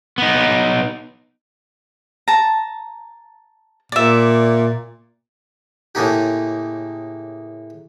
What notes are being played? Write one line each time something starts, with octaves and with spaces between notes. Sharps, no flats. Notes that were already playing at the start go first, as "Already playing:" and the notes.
B3 D#4
A5 A#5
A#2 D5 E5
A2 C#3 G#3 A#3 D#4 G4